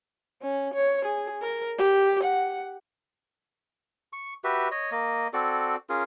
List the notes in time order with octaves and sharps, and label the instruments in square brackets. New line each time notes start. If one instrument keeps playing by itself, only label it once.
[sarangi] C#4
C#5
G#4
A#4
G4
F#5
[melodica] C#6
F#4 G4 B4 E5
C#5 D#5
A#3 D#5
C4 F#4 A4 D5
C#4 F4 G#4 A#4